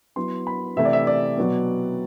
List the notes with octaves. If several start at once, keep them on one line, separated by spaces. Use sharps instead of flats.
F#3 B3 E4 C6
B5
C3 E3 A3 E4 E5
D5
E5
D5
B2 F#3 B3